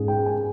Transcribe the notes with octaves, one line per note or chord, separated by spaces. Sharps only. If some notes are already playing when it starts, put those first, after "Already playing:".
Already playing: G#2 C#4 G#4
G5
G#5